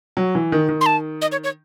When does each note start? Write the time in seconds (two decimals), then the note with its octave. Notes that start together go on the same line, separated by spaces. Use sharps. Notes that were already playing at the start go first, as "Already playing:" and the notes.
0.17 F#3
0.35 E3
0.52 D#3
0.69 D#3
0.81 C6
0.86 A5
1.22 D#5
1.32 C#5
1.44 C#5